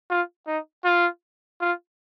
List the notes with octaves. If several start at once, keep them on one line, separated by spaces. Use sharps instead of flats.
F4
D#4
F4
F4